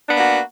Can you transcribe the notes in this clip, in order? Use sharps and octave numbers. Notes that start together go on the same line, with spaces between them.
A#3 B3 D4 F#4